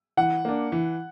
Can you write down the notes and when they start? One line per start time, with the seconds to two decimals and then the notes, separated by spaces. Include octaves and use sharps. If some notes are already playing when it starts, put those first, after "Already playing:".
0.17 E3 F#5
0.45 A#3 D4
0.72 E3